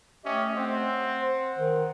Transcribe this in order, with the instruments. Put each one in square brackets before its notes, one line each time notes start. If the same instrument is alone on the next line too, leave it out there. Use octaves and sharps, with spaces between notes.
[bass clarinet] A3 [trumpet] C#4 [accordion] G4 D#5 E5
[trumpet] C4 [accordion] F#5
[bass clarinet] C5
D#3